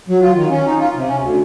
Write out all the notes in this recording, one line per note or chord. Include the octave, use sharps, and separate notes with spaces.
F#3
F4
D#3
C#4
D#4
F4
C3
C#4
D2